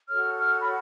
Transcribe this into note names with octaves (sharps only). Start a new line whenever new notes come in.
F#4 A4 C#5 F6
F6
B5